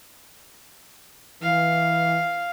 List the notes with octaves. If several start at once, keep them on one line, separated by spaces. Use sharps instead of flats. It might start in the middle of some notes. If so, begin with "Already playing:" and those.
E3 F5